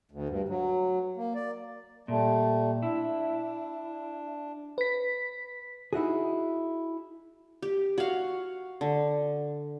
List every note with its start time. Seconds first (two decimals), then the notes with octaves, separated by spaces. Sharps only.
0.11 D2
0.29 G2
0.48 F#3
1.17 A#3
1.35 D5
2.08 A#2 G3 A3
2.83 D4 E4
4.78 B4 B6
5.93 D#4 E4 F#4 G#4
7.62 G4
7.98 F#4 F5
8.81 D3